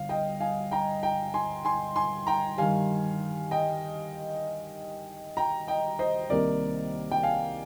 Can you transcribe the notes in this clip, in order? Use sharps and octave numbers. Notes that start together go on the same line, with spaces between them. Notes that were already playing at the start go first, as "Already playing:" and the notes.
Already playing: G1 F5
D#5 G5
F5 G#5
G5 A#5
G5 A#5
G#5 C6
G#5 C6
G#5 C6
G5 A#5
G2 D#3 G3 F5 G#5
D#5 G5
G5 A#5
D#5 G5
C5 D#5
C2 C3 D#3 A#3 A#4 D5
G5
F5 G#5